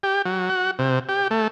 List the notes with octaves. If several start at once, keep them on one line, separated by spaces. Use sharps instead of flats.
G4
F#3
F#4
C3
G4
A3